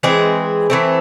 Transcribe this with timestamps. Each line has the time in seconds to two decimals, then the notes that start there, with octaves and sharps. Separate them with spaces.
0.03 E3 G#3 C4 G#4
0.70 E3 A3 C4